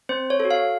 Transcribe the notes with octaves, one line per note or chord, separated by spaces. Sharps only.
C4 C5
C#5
F#4 A4
F5